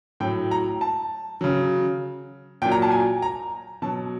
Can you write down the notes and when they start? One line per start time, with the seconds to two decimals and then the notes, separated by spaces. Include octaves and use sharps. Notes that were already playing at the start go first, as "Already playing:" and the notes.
0.20 A2 F#3 G5
0.51 A#5
0.81 A5
1.41 C#3 F#3
2.62 A#2 F#3 G5
2.72 A#5
2.82 A5
2.92 G#5
3.22 A#5
3.82 B2 F#3 A5